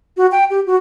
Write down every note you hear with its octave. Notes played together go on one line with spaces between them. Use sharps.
F#4
G5
G4
F#4